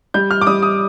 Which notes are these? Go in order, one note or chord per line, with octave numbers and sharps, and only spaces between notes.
G3 G6
F6
D6
G3 D#6
D#6